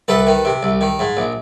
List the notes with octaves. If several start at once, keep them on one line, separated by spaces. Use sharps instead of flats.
C2 A4 B4
D#3
C3
C2
D#3
G#2
A#1